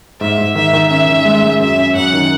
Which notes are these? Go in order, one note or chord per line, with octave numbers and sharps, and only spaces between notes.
G#2 E5
G#2
D#3 E5
D#3
C#4 E5
D#3
G#3
G#3
F#2 E5
C#4
F#2 F#5
D#3